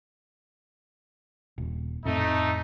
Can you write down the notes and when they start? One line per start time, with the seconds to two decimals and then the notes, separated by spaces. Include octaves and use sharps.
1.58 D#1
2.05 F2 A2 A3 C4 D#4